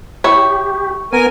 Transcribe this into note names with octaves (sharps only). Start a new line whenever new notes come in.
E4 G4 C#5 C#6
B3 A#4 G#5